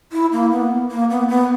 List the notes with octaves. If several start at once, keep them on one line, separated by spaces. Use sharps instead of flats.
E4
A#3
B3
A#3
B3
B3